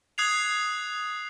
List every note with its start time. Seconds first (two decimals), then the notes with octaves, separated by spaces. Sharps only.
0.18 D#6 F#6 G#6 C7 F7